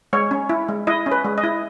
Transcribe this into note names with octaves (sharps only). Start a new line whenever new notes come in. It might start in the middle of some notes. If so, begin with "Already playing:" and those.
G#3 C#5
C#4
E4
G#3
E4 D#5
C#4
B4
G#3
D#5
E4